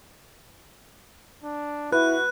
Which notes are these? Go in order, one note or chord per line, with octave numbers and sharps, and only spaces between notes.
D4
E4 F#4 B4 F#6